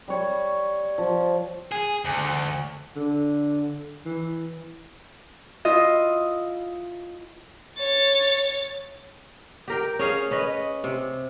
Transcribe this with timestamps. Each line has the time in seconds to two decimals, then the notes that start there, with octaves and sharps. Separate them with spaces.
0.08 G3 C#5
0.98 F3
1.72 G#4
2.05 D2
2.96 D3
4.05 E3
5.65 E4 F4 D#5
7.78 C#5 A6
9.68 G4 A#4 G5
9.99 C#4 G#4 F5
10.31 C#4 B4 D#5
10.84 C3